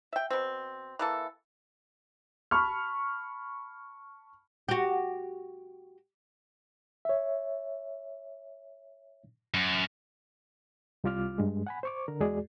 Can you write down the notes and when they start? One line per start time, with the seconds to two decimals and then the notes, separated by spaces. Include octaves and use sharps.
0.13 E5 G5
0.30 B2 C4
0.99 E3 A#3 A4
2.51 A5 B5 C#6 F6
4.69 F#4 G4
7.05 C#5 E5
9.54 F#2
11.04 C2 G3 F4 D6 F6
11.38 G2 G#3
11.67 F#5 G#5 B5
11.83 C5 C#6 D6
12.08 D3 A#4
12.20 E2 G#3 F#4 G#4 D5